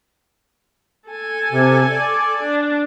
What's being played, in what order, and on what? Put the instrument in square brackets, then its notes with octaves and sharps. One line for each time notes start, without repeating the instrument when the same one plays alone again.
[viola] A4 G#5
[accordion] C3
D5
[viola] D4